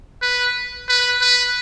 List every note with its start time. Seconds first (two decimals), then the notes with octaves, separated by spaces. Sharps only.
0.22 B4
0.88 B4
1.21 B4